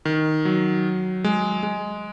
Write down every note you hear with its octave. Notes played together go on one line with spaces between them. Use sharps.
D#3
F#3
G#3
G#3